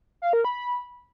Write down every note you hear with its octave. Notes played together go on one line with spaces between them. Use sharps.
F5
A#4
B5